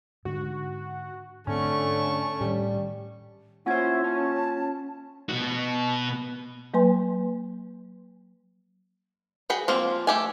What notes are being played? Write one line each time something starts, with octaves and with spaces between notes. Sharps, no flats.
G#2 D3 F#4
G#2 D3 A3 C4 C#4 C#6
A2 D#3 G3
A#3 C#4 E4 F4 C5 F#5 G#5 G#6
C#4 A5
B2 F#4
F#3 A#3 B4 G#5 C6
F#4 G#4 G5 B5
F3 A#3 C4
A3 G4 G#5